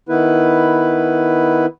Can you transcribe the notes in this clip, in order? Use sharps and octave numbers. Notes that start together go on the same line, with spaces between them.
D#3 B3 E4 B4